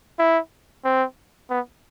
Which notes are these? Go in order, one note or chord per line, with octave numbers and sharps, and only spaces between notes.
E4
C4
B3